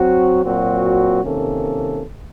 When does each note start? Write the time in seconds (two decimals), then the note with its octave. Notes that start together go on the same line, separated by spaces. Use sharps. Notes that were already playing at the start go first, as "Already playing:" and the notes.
Already playing: F#3 C4 F#4
0.44 A#2 F#3 C4 F#4
1.24 C3 D#3 A#3 C#4 A4